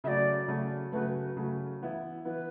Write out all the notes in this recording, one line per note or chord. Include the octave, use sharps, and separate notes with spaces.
C#3 F#3 A3 D5 E5
C#3 F#3 A3
C#3 F#3 A3 B4
C#3 F#3 A3
E3 B3 E4
E3 B3 E4 B4